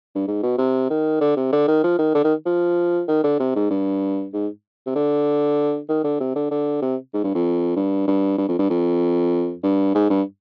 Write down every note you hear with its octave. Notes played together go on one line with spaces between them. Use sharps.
G2
G#2
B2
C3
D#3
D3
C3
D3
D#3
F3
D#3
D3
D#3
F3
D#3
D3
C3
G#2
G2
G#2
C3
D3
D#3
D3
C3
D3
D3
C3
G#2
G2
F2
G2
G2
G2
F2
G2
F2
G2
G#2
G2